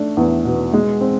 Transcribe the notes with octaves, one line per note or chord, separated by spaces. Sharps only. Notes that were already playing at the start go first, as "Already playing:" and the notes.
Already playing: A3 D4
E2
B2
G#3
C4